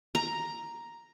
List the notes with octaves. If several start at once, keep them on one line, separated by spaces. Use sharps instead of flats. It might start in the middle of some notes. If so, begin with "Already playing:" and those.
A#5